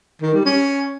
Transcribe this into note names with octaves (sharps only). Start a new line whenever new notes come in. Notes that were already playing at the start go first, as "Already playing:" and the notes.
D#3
G3
C#4